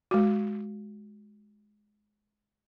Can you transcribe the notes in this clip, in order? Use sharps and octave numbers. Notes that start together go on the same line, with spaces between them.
G#3 F#4